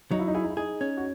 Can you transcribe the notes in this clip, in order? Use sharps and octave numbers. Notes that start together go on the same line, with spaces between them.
F#3 D#4
E4
D#4
E4 G#4
D#4
E4
D#4 G#4
C#4
F#4